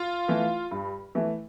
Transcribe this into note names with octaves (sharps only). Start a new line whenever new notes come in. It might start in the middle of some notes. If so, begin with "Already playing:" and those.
Already playing: F4
E3 A3
G2
E3 A3